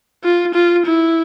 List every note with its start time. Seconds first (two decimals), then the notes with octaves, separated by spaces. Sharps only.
0.24 F4
0.54 F4
0.86 E4